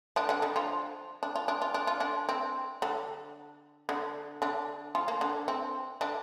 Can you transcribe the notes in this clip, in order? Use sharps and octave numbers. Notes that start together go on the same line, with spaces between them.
D3 D4
D3 D4
D3 D4
F3 F4
D4
F4
D4
F4
D4
F4
D3 D4
C4
D3 D4
D3 D4
D3 D4
F3 F4
A#3
D3 D4
C4
D3 D4